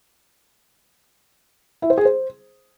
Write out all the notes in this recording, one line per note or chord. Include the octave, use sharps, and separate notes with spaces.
E4
C5
G#4
C5